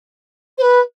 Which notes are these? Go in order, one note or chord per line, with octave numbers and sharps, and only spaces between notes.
C5
B4